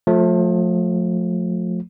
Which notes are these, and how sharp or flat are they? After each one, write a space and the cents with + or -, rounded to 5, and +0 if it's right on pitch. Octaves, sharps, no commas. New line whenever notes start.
F3 +35 A3 +0